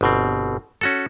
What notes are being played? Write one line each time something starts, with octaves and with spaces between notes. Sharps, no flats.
G1 B2 C4
C#4 F#4 A4